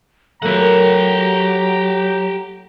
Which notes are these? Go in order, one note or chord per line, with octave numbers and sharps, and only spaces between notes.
F#3 A3 A#3 E4 G4 F#5 A#5